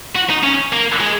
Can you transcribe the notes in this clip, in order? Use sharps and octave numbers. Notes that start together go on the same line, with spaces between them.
F#4
D#4
C#4
A#3
G#3